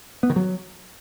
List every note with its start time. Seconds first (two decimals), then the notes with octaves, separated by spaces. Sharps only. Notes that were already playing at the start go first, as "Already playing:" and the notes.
0.23 B3
0.30 D#3
0.36 F#3